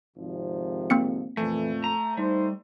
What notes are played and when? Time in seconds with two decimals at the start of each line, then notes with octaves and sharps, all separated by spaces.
0.17 G#1 C3 F3
0.90 A#3 C4 C#7
1.37 F2 A#2 E3 A3
1.84 A#5
2.17 G3 D#4 C5